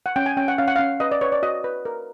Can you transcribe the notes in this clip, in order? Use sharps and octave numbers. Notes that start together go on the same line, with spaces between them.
F#5
C#4 G5
G#5
C#4 G5
F#5
C#4 F5
F#5
C#4 F5
B4 D#5
D5
B4 C#5
D5
F#4 D#5
B4
A#4